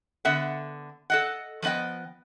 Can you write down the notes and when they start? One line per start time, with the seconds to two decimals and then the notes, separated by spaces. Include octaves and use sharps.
0.25 D3 B3 E5 F#5
1.10 A4 D#5 F#5
1.62 F3 A3 B3 D#5 G5